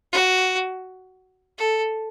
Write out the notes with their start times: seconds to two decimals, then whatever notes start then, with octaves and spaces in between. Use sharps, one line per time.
0.13 F#4
1.59 A4